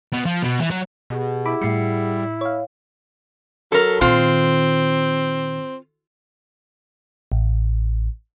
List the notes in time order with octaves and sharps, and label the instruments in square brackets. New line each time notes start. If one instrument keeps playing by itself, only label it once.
[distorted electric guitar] B2
F3
B2
E3
F#3
[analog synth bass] B2 [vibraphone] G4 G#4 F#5
[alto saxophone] E4 [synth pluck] B5 D6
[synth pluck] A2 C7 C#7 [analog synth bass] G3
[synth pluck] C#5 F5
[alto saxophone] F#3 [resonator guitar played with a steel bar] A4 A#4
[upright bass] A#2 D#3 [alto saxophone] C4 [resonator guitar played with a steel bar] F4
[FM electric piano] A1